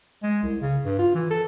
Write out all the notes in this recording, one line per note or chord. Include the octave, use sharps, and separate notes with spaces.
G#3
C2
C#3
G2
F4
E3
A4